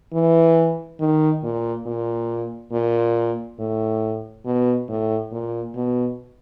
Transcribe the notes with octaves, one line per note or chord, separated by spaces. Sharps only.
E3
D#3
A#2
A#2
A#2
A2
B2
A2
A#2
B2